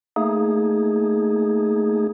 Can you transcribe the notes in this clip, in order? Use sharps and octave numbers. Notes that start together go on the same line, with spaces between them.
A3 A#3 D#4 G#4